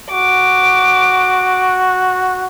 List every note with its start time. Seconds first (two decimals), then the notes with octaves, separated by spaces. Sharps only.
0.12 F#4 D6